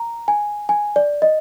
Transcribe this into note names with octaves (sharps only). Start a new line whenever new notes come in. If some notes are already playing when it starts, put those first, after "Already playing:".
Already playing: A#5
G#5
G#5
D5
D#5